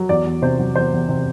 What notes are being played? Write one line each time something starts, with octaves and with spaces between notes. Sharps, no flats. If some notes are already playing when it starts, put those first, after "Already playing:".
Already playing: F#3
E2 D5
E2
C3 C5
F#3
E2 C5
E2
C3